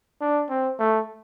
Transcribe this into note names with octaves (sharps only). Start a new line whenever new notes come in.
D4
C4
A3